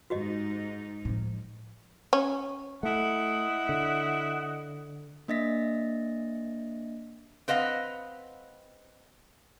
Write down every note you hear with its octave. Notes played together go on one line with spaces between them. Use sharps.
G#2 D#4 F#4 G4 D#5
A2 F3
C#4
A3 E4 D#5 F#5
D3
A#3 D4 D#5 E5 A#6 B6
C4 B4 D#5 F5 F#5